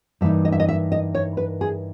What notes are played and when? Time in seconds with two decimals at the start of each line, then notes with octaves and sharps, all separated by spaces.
0.21 G2 E3 A#3 D#4 E5
0.45 D#5
0.52 E5
0.60 D#5
0.68 E5
0.92 D#5
1.15 C#5
1.37 B4
1.61 G#4